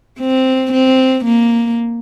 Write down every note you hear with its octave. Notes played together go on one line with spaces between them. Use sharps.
C4
C4
A#3